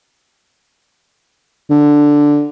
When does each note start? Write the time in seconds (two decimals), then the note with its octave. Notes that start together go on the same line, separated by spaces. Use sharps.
1.70 D3